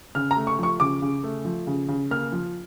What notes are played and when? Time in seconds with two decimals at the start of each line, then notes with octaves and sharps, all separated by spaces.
0.15 C#3 F6
0.31 A#5
0.37 A3
0.47 C#6
0.59 F3 C#6
0.80 C#3 D6
1.02 C#3
1.23 A3
1.45 F3
1.67 C#3
1.88 C#3
2.11 A#3 F6
2.32 F3